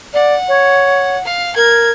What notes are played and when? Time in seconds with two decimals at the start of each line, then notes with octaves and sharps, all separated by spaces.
0.14 D5 F#5
0.48 C#5
1.25 F5
1.56 A#4 G#6